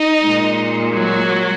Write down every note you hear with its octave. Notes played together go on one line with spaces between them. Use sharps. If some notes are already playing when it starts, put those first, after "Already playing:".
Already playing: D#4 D#5
A#2 G#3
F#3 F#4